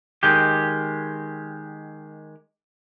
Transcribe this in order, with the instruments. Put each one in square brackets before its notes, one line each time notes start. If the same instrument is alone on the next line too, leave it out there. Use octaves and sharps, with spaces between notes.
[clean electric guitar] D#3 G#3 G4